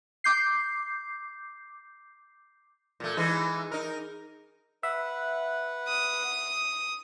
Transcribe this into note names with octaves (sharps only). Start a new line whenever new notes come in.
D6 G6 C7
A#2 A3
E3 G#3 D#4
D#4 A#4
B4 E5 F#5
D#6